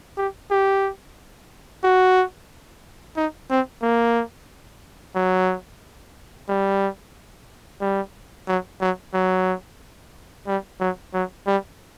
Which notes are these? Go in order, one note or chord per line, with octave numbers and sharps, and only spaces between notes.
G4
G4
F#4
D#4
C4
A#3
F#3
G3
G3
F#3
F#3
F#3
G3
F#3
F#3
G3